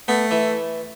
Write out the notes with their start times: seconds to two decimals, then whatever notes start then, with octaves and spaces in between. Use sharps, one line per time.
0.08 A3 B3
0.31 E3